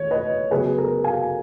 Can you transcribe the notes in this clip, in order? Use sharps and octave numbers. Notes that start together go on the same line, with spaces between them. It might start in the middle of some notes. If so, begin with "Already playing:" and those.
Already playing: D#3 C#5
B4 D#5
C#3 F#3 B3 G#4 B4
A#4
F5 G#5